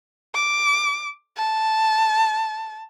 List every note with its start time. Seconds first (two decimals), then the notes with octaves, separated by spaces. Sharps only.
0.34 D6
1.37 A5